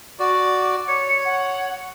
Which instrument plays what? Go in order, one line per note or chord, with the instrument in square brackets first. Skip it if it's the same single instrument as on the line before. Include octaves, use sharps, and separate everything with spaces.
[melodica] F#4 D5 [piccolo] D6
[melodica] C#5 [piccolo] C#7
[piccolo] F#5